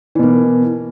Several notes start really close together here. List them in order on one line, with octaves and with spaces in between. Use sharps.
E3 B2 A#3